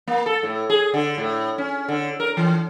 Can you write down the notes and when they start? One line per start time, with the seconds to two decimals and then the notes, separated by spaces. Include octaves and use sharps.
0.07 A#3
0.26 A4
0.43 A2
0.70 G#4
0.94 D3
1.18 A2
1.58 C#4
1.88 D3
2.20 A#4
2.37 E3